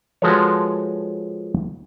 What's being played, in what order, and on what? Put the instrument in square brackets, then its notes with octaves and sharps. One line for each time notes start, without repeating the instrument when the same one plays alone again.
[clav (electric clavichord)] F3 G#3 F#4 A4 B4 C#5